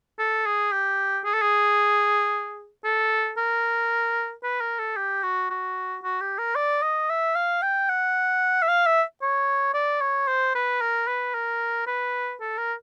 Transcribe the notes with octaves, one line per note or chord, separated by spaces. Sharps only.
A4
G#4
G4
G#4
A4
G#4
A4
A#4
B4
A#4
A4
G4
F#4
F#4
F#4
G4
A#4
D5
D#5
E5
F5
G5
F#5
E5
F5
E5
C#5
D5
C#5
C5
B4
A#4
B4
A#4
B4
A4
A#4